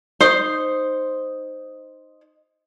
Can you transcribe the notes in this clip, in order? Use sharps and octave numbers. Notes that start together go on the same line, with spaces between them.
D#4 C5